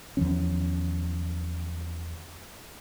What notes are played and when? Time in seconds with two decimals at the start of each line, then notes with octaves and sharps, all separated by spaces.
0.17 E2 D#3 F3 C#4